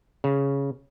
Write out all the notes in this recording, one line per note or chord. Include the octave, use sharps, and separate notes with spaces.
C#3